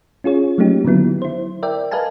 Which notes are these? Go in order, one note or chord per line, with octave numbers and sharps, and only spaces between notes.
C#4 F4 G#4 C#5
F#3 A3 A#3 C#4 D#4 G4
D3 D#3 F#3 B3 E4
E4 C5
A#4 D5 E5 G5
A#4 B4 D#5 F5 G#5 A5